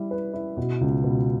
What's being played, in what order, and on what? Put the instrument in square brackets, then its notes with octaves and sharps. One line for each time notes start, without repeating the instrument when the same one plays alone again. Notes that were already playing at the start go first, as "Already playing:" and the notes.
Already playing: [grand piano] G3 E4
B4
E4
B2
C#2
B2